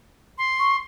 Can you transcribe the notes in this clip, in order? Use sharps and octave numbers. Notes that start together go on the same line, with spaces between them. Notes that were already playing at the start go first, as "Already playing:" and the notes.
C6
C#6